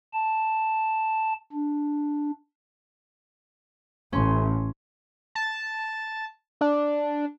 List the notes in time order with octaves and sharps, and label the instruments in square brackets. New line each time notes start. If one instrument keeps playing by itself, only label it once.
[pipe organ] A5
D4
[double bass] A1 [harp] C#4 C6
[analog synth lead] A5
D4